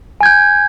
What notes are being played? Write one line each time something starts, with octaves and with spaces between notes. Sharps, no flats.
G#5 G6 G#6